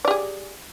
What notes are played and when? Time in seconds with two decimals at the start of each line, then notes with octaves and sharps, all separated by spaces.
0.05 D5
0.08 G4
0.11 G#4